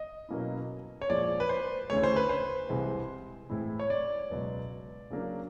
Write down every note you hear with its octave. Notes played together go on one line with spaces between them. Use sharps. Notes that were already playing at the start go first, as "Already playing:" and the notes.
Already playing: D#5
B2 F#3 A#3 C#4 E4
C#5
A#2 F3 G#3 D5
B4
C5
D2 C#3 E3 A3 C#5
C5
B4
C5
C2 C3 E3 G#3
A2 E3 G#3 C4 E4
C#5
D5
C#2 B2 F#3 B3
C#3 F#3 A#3 D4